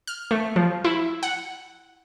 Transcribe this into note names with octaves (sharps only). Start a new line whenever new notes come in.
F6
A3
F3
E4
F#5